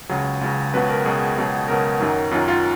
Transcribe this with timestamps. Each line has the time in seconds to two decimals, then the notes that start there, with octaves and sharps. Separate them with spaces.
0.09 C#2 C#3 F#3
0.41 C#2 C#3 F#3
0.73 C#2 B2 F#3 B4
0.89 A#4
1.05 C#2 B2 F#3 G#4
1.37 C#2 B2 F#3
1.68 C#2 B2 F#3 A#4
2.00 F#2 D#3 F#3
2.31 F#2 D#3 F#3 F4
2.48 F4